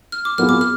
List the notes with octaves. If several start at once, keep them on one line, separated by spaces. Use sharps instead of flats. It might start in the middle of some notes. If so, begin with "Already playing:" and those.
F6
D6
F#3 B3 F4 G#4 F6
D6
F6